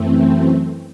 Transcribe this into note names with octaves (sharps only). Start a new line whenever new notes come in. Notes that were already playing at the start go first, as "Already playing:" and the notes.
Already playing: F#2 E3 A3 C4